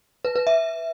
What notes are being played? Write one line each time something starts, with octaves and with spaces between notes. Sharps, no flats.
B4
B4
E5